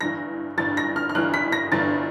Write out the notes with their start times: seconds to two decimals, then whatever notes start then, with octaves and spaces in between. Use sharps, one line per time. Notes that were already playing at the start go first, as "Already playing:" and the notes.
0.01 G1 G2 E3 A#6
0.57 G1 G2 E3 A6
0.77 A#6
0.96 F6
1.09 F6
1.15 G1 G2 E3 F#6
1.34 B6
1.52 A#6
1.72 G1 G2 E3 A6